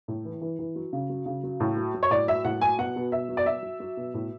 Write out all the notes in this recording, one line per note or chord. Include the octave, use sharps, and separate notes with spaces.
A2
E3
E3
E3
F#3
C#3
F#3
C#3
F#3
A2
F#3
F#3
C#5
A2 D5
F#3 E5
A2 F#5
F#3 G#5
B2 F#5
B2
B2 E5
F#3
D5
F#3 E5
F#3
F#3
B2
A2